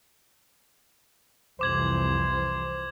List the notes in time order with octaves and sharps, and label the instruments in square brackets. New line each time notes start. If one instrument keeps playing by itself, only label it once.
[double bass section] C2 F2 E3 [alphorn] C5 [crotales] D6 G#6 F#7